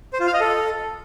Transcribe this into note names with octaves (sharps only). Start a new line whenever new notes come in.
C5
F4
F5
D#5
A4